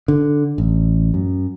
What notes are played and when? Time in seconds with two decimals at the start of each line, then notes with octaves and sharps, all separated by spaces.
0.08 D3
0.58 A1
1.14 F#2